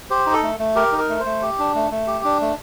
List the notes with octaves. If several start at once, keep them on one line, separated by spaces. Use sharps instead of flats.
G4 C5
D#4
A4
A3
A3
G4 A#4
D#4
A#4
A3
C5
A3
G4
D4
A3
A3
G4
D4
A3